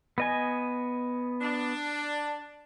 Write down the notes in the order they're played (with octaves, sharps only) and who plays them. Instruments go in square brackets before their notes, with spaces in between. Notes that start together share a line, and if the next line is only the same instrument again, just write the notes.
[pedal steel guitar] B3 D#5 G#5
[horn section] D4